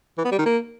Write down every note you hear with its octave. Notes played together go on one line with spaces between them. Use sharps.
E3
B3
G3
D#3
A#3